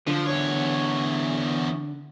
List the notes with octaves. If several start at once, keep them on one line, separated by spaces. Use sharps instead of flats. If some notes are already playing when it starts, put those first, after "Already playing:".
D3 F3
E2 C#5